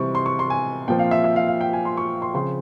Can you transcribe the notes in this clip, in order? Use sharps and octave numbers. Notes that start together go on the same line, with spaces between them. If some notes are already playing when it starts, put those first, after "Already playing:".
Already playing: C3 E3 G3 C4 C#6
C6
C#6
C6
G#5
A#2 F3 C4 G5
F5
E5
E5
F5
F5
G5
G#5
C6
C#6
C6
C#3 F3 C4 C6